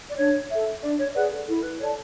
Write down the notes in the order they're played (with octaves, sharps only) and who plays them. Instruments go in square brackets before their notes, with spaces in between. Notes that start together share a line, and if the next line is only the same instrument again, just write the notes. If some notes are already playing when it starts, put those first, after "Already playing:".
[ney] D5
[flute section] D4 [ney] C#5
[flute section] A4 E5
[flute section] D4 [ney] D5
[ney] C#5
[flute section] G#4 D5 F#5 [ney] B4
[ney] A4
[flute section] E4 [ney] A4
[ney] A4
B4
[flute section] A4 D5 A5 [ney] C#5